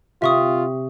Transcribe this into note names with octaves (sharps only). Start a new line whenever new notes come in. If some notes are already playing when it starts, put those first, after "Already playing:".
C3 F4 E5 C#6 D#6